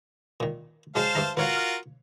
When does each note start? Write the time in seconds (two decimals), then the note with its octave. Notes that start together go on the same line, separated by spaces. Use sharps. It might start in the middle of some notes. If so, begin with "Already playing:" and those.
0.40 A#2 D#3
0.95 F#3 G#3 C5 F5 A5
1.15 G2 E5 A#5
1.37 F4 F#4 A#4 B4 C#5 F5